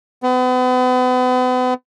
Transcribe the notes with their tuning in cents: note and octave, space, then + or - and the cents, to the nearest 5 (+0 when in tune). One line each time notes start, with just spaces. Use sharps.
B3 +40